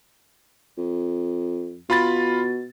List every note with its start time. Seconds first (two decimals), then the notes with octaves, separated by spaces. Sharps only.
0.78 F2
1.90 B2 F4 B5 A6